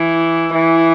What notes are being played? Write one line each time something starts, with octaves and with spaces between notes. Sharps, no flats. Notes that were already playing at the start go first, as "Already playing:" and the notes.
Already playing: E3
E3